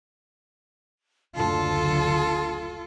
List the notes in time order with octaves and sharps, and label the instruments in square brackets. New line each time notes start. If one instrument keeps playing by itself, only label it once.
[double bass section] F#1 D2 D3 [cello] F4 A4 [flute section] A5 C6